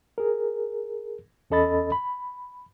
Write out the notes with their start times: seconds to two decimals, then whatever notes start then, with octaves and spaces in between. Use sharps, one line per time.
0.18 G#4 A#4
1.50 E2 C#4 A4 D#5 B5 A6
1.92 B5